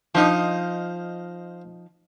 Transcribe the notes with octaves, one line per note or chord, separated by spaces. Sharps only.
F3 D#4 C5 D#5 F5